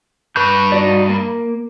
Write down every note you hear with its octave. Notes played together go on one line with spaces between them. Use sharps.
G2 B4 C#6 G6
D#4 F#4 D5
A#3